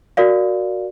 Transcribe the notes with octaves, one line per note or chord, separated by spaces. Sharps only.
F#4 A#4 D5 F5